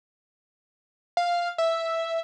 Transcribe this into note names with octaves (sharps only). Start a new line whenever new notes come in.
F5
E5